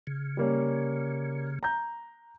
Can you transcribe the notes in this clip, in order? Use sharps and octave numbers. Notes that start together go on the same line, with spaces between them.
C#3
G3 A#3 C#4
A#5 G6